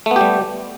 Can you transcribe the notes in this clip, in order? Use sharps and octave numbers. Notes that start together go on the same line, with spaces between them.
G3 A3 B3 G4